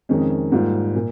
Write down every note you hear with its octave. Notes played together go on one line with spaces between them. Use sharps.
F2 C3 D#3 G#3 C#4
G#2 G3 A#3 F4
A#2